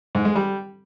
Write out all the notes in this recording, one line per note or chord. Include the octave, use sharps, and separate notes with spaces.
G#2
G#3
G3